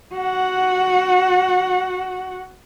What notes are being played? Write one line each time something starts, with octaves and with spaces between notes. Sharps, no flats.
F#4 F#5